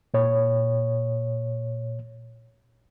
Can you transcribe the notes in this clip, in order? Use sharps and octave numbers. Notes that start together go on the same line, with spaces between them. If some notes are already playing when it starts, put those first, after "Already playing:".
A#2 C#5